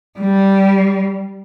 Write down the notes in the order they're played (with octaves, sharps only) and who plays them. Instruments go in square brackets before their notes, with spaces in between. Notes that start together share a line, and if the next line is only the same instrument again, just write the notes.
[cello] G3